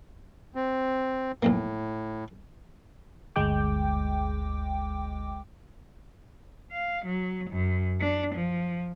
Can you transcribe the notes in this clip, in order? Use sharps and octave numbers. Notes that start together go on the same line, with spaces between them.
C4
B1 F2 A2 A#3
G1 D2 G#3 G5 D6
F5
F#3
F#2
D4
F3